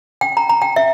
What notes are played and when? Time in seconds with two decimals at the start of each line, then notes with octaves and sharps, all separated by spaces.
0.21 G5
0.37 A#5
0.49 A#5
0.62 G5
0.76 E5